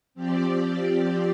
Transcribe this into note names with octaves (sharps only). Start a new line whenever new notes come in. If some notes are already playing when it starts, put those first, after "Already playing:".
F3 C4 G4 D5